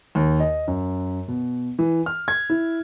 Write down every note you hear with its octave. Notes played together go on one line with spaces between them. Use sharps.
D#2
D#5
F#2
B2
E3
F6
G#6
E4